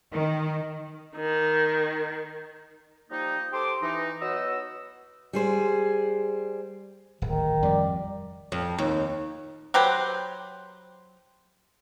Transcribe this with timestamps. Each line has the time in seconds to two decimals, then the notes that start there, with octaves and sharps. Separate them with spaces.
0.12 D#3
1.16 D#3
3.10 F3 G3 A#3 D#4
3.53 G4 A4 C5 C6 D6
3.82 E3 D#4
4.21 F#3 B3 F#4 D#5 E6
5.33 G3 G#4 C5
7.22 D1 G#1 D#3
7.63 F2 G3 D5
8.52 F2
8.79 D#2
9.74 F#3 G4 B4 C5